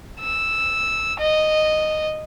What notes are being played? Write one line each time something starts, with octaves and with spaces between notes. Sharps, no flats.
E6
D#5